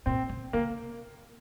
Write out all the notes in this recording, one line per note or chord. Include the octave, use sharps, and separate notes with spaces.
A#2 C4
C#3
C#3 A#3